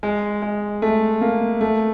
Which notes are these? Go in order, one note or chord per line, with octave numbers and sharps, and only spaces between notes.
G#3
G#3
A3
A#3
A3